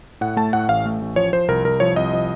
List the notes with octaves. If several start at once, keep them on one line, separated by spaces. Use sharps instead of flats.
A2 F#5
A3 A5
A2 F#5
A1 F5
A3
A1
F3 C#5
F3 C5
C2 A#4
C2 A#4
F3 C#5
C2 D#5
F3